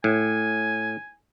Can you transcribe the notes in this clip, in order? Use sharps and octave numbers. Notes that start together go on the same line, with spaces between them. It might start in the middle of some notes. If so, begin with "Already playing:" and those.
A2 G#5